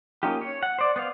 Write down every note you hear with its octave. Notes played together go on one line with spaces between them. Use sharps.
A#3 C#4 D#4 F4 G4
C#5
F#5
C5 D5
B3 C5 F5